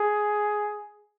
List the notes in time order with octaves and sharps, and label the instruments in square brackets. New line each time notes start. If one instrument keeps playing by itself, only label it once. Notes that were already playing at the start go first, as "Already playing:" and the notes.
Already playing: [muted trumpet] G#4